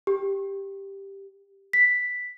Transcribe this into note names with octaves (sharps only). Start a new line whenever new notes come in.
G4
B6